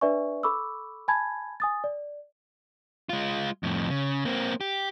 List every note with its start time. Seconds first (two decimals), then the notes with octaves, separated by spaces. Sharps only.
0.01 D4 B4 D5 E5 G#5 C#6
0.43 A4 B5 C#6 D6 E6
1.08 G#5 A5 B5 G#6
1.60 G#5 D#6 A6
1.84 D5
3.09 G#3 F4
3.63 F2 A2
3.90 C#3
4.25 A#3 C4
4.61 G4